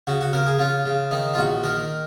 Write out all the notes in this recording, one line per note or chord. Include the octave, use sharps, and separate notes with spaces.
C#3 F#4
F#4
C#3 A#4
G#4
C#3 F4
C#3
D#3 D#4
F4
A#1 F#4
D#3 A#4